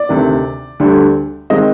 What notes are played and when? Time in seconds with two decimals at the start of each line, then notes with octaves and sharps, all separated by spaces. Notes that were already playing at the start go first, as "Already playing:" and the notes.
Already playing: D5
0.09 D2 C3 D#3
0.80 D2 D3 G3 D4
1.50 D#3 G#3 C4 D#5